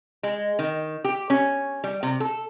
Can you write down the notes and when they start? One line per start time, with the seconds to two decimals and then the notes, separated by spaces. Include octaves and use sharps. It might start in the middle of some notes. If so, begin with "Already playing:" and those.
0.23 G#3
0.59 D#3
1.04 G4
1.30 C#4
1.84 G3
2.03 C3
2.20 A4